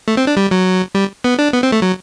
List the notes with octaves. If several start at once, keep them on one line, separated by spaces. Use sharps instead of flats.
A3
C4
D4
G3
F#3
G3
B3
D4
B3
C4
A3
F#3